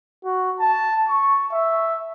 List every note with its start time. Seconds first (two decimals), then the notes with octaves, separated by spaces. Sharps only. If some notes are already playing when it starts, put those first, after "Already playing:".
0.25 F#4
0.60 A5
1.08 C#6
1.53 E5